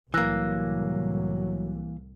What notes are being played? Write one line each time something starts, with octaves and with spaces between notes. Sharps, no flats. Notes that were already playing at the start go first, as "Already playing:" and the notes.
C2 A2 E3 F#3 A#3 E6 F#6 A#6